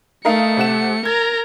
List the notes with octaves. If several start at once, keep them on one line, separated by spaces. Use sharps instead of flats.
A3 D#4 A#4 F5 C#7
C3 F#5 E7
A#4 A#5 G#6